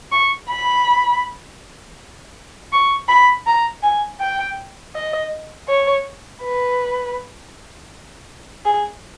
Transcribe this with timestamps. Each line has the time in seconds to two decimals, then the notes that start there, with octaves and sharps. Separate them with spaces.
0.12 C#6
0.50 B5
2.73 C#6
3.09 B5
3.47 A#5
3.83 G#5
4.20 G5
4.95 D#5
5.68 C#5
6.43 B4
8.66 G#4